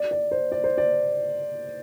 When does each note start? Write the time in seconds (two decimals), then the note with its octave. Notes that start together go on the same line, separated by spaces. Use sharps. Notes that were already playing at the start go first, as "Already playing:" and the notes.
Already playing: D5
0.11 D5
0.31 C5
0.52 D5
0.64 C5
0.78 D5